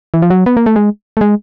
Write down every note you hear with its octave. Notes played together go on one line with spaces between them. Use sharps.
E3
F3
F#3
B3
A#3
A3
G#3
A3
G#3